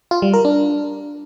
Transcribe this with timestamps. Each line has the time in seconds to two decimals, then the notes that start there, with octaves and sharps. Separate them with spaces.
0.11 F4
0.22 G3
0.33 A#4
0.45 D4